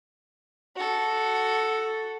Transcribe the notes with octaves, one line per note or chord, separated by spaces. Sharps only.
F#4 A4